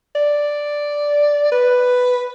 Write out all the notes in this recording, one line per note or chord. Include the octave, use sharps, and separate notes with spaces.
D5
B4